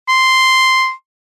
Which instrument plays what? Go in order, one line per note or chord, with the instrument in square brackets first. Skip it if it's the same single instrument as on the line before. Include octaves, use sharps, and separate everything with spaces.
[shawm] C6